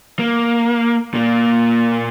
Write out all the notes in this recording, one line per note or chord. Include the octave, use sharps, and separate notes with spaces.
A#3
A#2 A#3